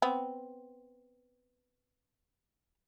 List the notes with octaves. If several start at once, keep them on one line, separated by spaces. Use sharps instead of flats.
B3 C4